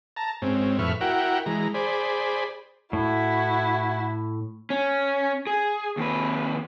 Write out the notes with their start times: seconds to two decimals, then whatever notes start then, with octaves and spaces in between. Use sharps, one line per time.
0.17 A5 A#5
0.42 G#2 C4 C#4
0.79 F2 A2 B4 E5 C#6 F6
1.01 E4 F#4 A#4 F#5 G5
1.46 E3 G#3 A#5
1.74 G#4 C5 D5 B5
2.93 A2 E4 F#4
4.70 C#4
5.47 G#4
5.97 D#2 B4